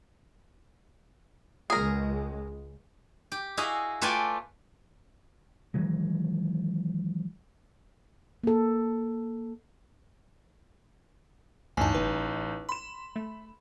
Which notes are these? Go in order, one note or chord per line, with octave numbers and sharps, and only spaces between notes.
C#2 G#3 G#4 A#4
G4
E4 F#4 G#4 D#5 F5
A3 F4 B4 D5 G5 G#5
D#3 E3 F#3 G#3
A#3 A4
A1 D2 G2 D#4 G#5 A5
G1 B4
B5 C6 E7
A3